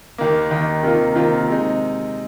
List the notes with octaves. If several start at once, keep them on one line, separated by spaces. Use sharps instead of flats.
D#2 D#3 A#3
D#2 D#3 A#3
C3 D#3 A#3 F4
C3 D#3 A#3 F4
C3 G#3 D#4